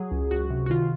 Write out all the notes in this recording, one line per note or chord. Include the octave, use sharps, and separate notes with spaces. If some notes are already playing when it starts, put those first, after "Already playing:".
Already playing: F#3 G#4
C#2
C#2 F#4
C3
F#4
D#3 F4